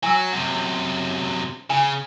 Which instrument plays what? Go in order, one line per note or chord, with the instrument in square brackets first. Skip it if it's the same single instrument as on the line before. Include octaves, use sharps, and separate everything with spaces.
[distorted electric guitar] F#3 [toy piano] G#5 E6
[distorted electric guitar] F#2 C3
[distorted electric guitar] C#3 [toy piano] G#5